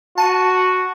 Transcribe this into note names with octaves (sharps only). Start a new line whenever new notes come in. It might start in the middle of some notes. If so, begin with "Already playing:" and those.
F#4 A5 D#7